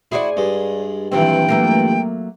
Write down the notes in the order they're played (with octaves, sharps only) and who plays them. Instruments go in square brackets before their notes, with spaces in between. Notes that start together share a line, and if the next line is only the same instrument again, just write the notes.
[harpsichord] E4 F#4 [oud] G#4 C5 D5
[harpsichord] G2 G#3
[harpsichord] G2 A#2 E3 [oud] D#3 F#3 C4 [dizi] G5
[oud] F#3 A3 A#3